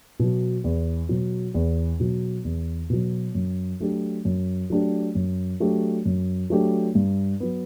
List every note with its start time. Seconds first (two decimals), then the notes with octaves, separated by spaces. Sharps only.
0.20 B2 F#3
0.64 E2
1.09 B2 F#3
1.54 E2
2.00 B2 F#3
2.44 E2
2.90 B2 F#3
3.35 F#2
3.80 F#3 A3 D4 G4
4.25 F#2
4.70 F#3 A3 D4 G4
5.15 F#2
5.60 F#3 A3 D4 G4
6.05 F#2
6.50 F#3 A3 D4 G4
6.95 G2
7.40 F#3 B3